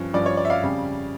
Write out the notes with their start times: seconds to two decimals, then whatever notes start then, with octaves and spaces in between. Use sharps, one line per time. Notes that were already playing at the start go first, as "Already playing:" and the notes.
Already playing: G2 F3 C#4
0.13 G2 F3 C#4 D5
0.26 C#5
0.37 D5
0.45 E5
0.50 D5 F5
0.62 F2 C#3 G3 C#4